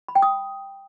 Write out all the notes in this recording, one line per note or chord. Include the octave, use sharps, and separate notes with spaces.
B5
G5
D#6